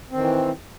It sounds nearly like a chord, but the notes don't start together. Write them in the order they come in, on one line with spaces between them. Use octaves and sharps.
C4 D#3 E3